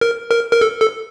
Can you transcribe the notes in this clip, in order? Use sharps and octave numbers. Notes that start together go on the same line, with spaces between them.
A#4
A#4
A#4
A4
A4